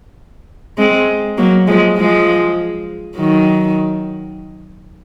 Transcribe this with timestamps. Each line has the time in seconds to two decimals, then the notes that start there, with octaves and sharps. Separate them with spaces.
0.78 G#3 C4
1.38 F#3 A#3
1.67 F3 G#3
1.97 F3 G#3
3.17 D#3 F#3